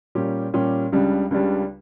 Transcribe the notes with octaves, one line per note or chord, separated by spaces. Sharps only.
A#2 G3 C#4 G4
A#2 G3 C#4 G4
C#2 C#3 G3 D4
C#2 C#3 G3 D4